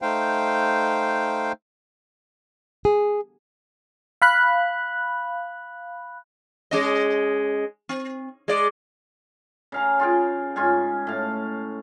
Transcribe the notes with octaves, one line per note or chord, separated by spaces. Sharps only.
A3 D#4 C5 F5 G5
G#4
F5 B5 F#6
G#3 C#4 D#5
C4
G#3 D5
C#3 F5 A#5
F4 G#4 G5
G#2 C#4 F4 G#5
A2 F5